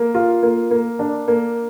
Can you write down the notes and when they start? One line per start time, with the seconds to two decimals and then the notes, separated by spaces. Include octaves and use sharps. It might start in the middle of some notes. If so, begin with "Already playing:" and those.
Already playing: A#3
0.14 F4
0.43 A#3
0.71 A#3
0.99 D4
1.28 A#3